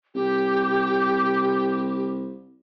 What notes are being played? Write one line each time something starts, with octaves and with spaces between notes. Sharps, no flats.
C2 G4